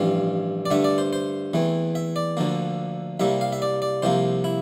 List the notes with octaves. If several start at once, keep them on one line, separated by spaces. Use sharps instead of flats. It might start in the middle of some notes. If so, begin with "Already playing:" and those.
Already playing: A1 G2 F3 C4 F5
D5
G2 D3 A3 E5
D5
C5
C5
E2 E3 A3 C4
E5
D5
D2 D3 F3 A#3
C2 C3 G3 A#3 E5
F5
E5
D5
D5
C2 C3 F3 A#3 C5
E4